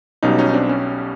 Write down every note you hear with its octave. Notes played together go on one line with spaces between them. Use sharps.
B1 B2 G3 C#4 D#4
C#4 D#4
D#4
C4 D4
C#4